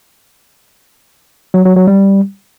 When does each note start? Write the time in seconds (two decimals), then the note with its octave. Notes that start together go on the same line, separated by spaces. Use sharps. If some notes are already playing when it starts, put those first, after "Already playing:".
1.54 F#3
1.65 F#3
1.76 F#3
1.87 G3